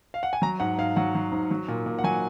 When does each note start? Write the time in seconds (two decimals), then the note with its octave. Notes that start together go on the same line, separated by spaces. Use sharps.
0.14 F5
0.23 F#5
0.33 G#5
0.42 F#3 A#5
0.60 G#2 F#5
0.78 G#2 F5
0.96 F#3 F#5
1.15 F#3
1.32 G#2
1.51 F#3
1.68 A#2
1.86 A#2
1.99 F#5
2.04 F#3 G#5